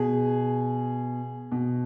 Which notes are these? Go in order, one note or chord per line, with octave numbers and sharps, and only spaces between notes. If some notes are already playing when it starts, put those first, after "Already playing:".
Already playing: B2 G#4
B2